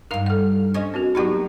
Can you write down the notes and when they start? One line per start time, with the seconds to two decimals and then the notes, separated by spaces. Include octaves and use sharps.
0.11 G2 D#4 A#4 F5
0.26 A4 F#5
0.74 C#4 C5 D#5
0.94 C4 F#4 A#4
1.15 F#3 A#3 B3 D#4 F#4 G4